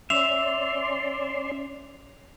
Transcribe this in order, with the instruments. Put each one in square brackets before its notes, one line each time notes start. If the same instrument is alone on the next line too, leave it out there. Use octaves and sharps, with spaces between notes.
[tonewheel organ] C#4 D5 C6 [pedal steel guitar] E5 [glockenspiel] F7